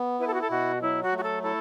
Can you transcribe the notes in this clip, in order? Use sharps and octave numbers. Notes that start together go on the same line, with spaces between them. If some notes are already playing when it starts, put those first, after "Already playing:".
Already playing: B3
E4 B4
A4
F#4
A4
B2 F#4
F#3 E4
F#4
A3
F#4
A4
E4 A4